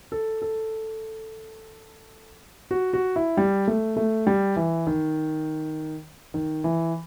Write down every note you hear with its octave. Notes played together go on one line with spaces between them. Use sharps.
A4
A4
F#4
F#4
E4
G3
A3
A3
G3
E3
D#3
D#3
E3